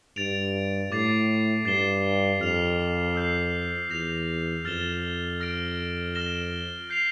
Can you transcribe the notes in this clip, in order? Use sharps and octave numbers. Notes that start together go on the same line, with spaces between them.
G2 A6 D7 F7
A2 D6 A6 C7
G2 A6 C7 E7 G7
F2 F6 C7 F7
E6 G6 C7
E2 G6 A#6 F7
F2 F6 A6 E7 G7
F6 A#6 D7
F6 A#6 E7 G7
G6 C7 F7